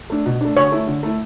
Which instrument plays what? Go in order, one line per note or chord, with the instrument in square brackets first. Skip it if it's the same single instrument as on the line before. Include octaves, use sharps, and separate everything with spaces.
[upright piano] A3 D4
B2
A3 D4
[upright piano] D3 [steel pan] C#5
[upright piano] A3 E4
D3
A3 E4